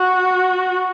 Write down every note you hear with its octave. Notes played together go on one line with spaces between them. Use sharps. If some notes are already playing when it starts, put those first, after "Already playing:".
Already playing: F#4